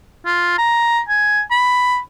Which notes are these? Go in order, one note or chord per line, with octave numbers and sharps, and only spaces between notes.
F4
A#5
G#5
B5